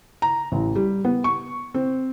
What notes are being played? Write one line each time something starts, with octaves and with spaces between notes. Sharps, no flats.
A#5
A1
G3
B3
C#6
C4